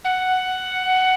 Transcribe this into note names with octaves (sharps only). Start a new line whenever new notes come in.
F#5